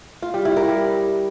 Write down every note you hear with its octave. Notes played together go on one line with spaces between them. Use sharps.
F4
G3
E4
A#4
G3